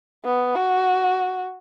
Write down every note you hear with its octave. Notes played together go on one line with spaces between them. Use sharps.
B3
F#4